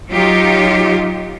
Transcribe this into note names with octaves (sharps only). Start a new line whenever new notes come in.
F#3 D#4 F4 G4